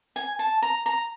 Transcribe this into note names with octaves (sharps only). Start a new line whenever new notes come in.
G#5
A5
A#5
A#5